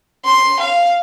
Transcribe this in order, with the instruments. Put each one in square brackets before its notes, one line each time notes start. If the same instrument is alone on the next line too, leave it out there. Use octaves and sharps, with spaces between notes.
[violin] C6
F5